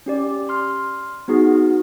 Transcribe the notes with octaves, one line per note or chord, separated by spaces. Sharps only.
C#4 G4 D5
C6 F6
B3 D#4 F#4 G#4